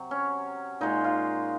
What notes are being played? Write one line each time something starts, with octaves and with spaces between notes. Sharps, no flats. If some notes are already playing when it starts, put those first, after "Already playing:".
Already playing: C3 F#3
C#4
A#2 G#3 D#4
F4